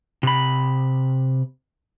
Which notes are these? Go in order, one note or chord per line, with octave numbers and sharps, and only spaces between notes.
C3 B5